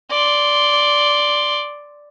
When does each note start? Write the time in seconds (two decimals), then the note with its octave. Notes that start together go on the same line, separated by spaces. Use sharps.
0.11 D5 C6